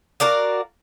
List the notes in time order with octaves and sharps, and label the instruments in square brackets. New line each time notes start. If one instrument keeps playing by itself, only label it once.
[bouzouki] F#4 A#4 D5 F5